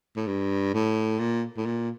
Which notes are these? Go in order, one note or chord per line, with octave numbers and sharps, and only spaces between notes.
A2
G2
A2
A#2
A2
A#2